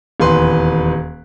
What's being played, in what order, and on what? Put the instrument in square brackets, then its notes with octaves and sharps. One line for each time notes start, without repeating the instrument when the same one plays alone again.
[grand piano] D#1 E2 B4 C6